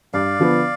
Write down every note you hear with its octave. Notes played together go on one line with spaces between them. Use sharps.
G2 D5 F5
D3 F3 B3